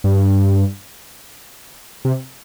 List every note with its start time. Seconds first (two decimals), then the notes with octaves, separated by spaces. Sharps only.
0.04 G2
2.05 C3